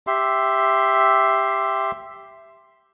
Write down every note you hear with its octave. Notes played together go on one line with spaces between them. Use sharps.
G4 E5 C6